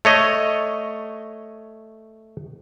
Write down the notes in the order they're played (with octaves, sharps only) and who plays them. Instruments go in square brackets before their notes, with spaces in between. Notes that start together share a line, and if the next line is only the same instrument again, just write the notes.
[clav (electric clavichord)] A3 C#5 D#5